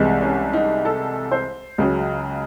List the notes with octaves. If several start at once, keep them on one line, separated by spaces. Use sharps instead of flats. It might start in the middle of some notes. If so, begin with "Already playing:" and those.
Already playing: C2 C3 E3 G#3
C#4
D#4
A4
C5
C#2 C#3 F#3